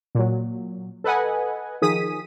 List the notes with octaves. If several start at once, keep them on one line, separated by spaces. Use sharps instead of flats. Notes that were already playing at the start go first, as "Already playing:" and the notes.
A#2 F#3
A4 B4 D#5 F#5 G#5
D#3 F3 G#4 D#6 B6 D#7